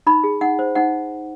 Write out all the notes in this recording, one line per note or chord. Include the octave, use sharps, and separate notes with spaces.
D#4 B5
G#4
D#4 F#5
C5
D#4 F#5